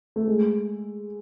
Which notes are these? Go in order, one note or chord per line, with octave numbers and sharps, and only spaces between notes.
A3
G#3